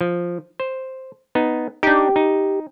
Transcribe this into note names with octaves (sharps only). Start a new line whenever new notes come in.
F3
C5
B3 D#4
D4 D#4 G4
D#4